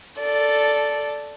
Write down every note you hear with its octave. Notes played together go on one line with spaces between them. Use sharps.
A4 D5